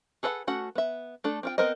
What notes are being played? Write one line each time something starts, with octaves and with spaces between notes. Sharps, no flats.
G#4 A4 B4 D#5 F#5
A3 C#4 F#4 F#5
B3 E5
A3 D4 A4
C4 F4 G5
B3 C4 A#4 C5 D#5